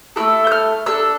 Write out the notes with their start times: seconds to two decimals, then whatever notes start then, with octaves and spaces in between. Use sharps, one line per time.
0.16 A3 C4 E4 A4 E6
0.47 G6
0.52 F6
0.86 D4 A4 E6